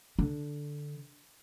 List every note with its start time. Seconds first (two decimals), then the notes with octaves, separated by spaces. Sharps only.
0.19 D3